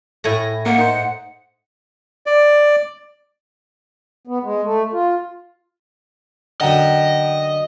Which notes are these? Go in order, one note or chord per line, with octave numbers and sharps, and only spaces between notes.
A2 A3 E4 G#5 A#6
A#3 F#5
D#4 C5
D5
B3
G#3
A3
F4
F#2 D3 D#5 F#5 G5 A#5